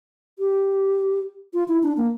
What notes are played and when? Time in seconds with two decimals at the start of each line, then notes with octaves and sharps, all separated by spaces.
0.39 G4
1.54 F4
1.68 E4
1.83 D4
1.97 A#3